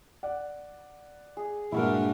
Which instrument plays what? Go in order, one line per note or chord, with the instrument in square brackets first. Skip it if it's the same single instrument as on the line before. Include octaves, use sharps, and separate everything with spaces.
[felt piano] D5 F#5
[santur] G#4
[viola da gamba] G2 G3 D4 [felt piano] A#2 G#3 [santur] E4 F#4 A#4